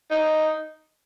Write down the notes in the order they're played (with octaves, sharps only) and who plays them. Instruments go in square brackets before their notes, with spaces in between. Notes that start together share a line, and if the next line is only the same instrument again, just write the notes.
[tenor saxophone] D#4